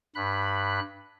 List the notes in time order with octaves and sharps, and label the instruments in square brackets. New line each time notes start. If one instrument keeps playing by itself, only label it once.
[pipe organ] G2 B5 F#6